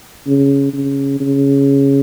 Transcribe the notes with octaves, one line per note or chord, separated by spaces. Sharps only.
C#3
C#3
C#3